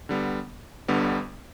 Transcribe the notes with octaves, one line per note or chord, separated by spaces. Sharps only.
D3 G3 B3
G1 G2 D3 G3 B3